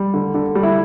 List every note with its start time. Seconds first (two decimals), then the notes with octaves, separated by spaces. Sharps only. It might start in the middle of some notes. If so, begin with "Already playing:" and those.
Already playing: G3
0.14 D3
0.34 D3
0.55 G3
0.63 E4